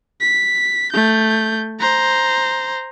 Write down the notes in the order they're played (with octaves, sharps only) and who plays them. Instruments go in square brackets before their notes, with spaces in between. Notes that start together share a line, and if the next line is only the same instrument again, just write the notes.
[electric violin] B6
A3 G6
C5 A#5